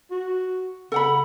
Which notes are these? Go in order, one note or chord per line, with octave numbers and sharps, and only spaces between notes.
F#4
C#3 A4 F#5 B5